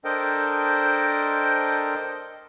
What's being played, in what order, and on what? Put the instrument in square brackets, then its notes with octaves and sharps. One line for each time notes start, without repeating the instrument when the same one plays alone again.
[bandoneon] D4 A4 A#4 C5 D#5 G5